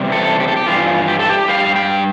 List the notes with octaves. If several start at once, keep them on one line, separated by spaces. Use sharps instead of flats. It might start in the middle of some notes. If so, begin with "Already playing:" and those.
Already playing: E2 C3 G3
A4
G4
A4
G4
G2 E3 F4
G4
A4
G4
G2 E3 G3 F5
G5